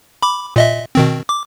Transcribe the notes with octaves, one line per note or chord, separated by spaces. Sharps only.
B5 D6
A#2 D#5 E5
B2 D#3 C4
D6